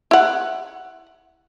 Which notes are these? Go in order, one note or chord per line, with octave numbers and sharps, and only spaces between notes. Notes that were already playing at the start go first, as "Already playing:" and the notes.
E4 F#5